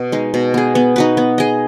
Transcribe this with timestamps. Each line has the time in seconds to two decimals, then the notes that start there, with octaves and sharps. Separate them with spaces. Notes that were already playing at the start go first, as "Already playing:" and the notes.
Already playing: B2 B3 F#4 B4 D#5
0.12 G#3 D#4
0.34 B2
0.54 B3 G#4
0.75 B3
0.96 D#4 F#4 B4
1.17 B3
1.38 G#4 D#5